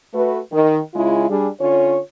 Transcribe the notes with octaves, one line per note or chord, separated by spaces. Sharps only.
A3 F#4 B4
D#3
C#3 G#3 E4 F4
G3 D4 G#4
D3 C#4 F4 C#5